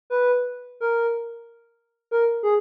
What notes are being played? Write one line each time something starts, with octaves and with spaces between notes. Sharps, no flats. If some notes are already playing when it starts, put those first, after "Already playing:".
B4
A#4
A#4
G#4